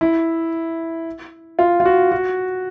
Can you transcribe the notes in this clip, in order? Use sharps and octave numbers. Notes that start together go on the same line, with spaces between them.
E4
F4
F4
F#4
F#4